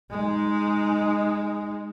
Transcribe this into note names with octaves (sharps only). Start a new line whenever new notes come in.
G#3 D#4